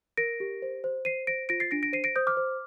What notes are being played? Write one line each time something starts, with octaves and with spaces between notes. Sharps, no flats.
A#4 A#6 D7
G4
C5
C5
C5 C7 D#7
C5 A#6 D7
F4 A#6 D7
A6 C7
D4 A#6 D7
A#6 D7
C5 C7 D#7
A#6 D7
C5 D#6 G6
D6 F6
C5